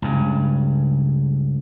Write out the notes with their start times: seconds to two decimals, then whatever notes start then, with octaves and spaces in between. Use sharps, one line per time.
0.02 C#2 G2 C#3